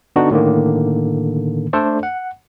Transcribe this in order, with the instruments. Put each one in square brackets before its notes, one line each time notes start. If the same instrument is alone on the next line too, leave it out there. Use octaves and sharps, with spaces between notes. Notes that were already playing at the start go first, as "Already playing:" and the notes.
[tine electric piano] D3 B3 D4 D#4 F#4
A2 D3 D#3 A#3
A3 D4 A4 C5 D5
F#5